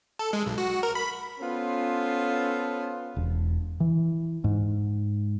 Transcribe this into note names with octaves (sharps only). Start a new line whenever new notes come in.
A4
G#3
B1
F#4
A#4
B5
B3 C#4 F4 A4 C5
E1
E3
G#2